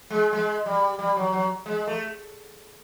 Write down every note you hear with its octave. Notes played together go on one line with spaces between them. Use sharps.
G#3
G#3
G3
G3
F#3
F#3
G#3
A3